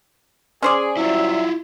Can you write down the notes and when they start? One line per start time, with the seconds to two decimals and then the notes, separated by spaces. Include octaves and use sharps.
0.62 C#4 G#4 C5 D5
0.97 F#3 G3 E4 F4 E5